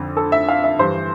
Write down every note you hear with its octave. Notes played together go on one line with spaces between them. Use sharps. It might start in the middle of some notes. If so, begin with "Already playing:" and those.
Already playing: F2 D3
A4
E5
F5
E5
G2 E3 C5